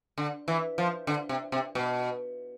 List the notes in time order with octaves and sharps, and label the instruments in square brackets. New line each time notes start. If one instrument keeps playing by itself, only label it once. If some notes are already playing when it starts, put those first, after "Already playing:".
[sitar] D3
E3
F3
D3
C3
C3
B2